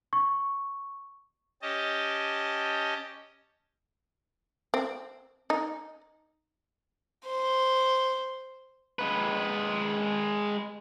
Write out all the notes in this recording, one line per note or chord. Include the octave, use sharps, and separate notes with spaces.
C#6
C#4 G4 D#5 A5
C4
D#4
C5
G#3 B4